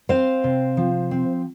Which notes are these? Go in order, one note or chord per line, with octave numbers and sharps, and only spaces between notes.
C4 C5 F5
C3
F3
C4